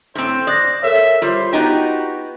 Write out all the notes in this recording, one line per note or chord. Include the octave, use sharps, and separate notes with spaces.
A2 C4 C5
D5 D#6 F#6 A#6
A4 A#4 C#5 E5
G3 F4 C5
B3 D#4 F#4 G4